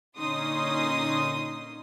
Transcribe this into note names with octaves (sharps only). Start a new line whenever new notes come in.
A#2 D3 C#4 D#4 C6 D#6